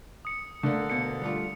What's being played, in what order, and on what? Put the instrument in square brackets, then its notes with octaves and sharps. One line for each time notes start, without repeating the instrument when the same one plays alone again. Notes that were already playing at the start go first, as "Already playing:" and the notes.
[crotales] D#6 C#7
[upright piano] D3 [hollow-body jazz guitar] A3 A#3
[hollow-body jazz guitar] D2 B2 A#3 [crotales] C#7
[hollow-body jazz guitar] G3 A3 F4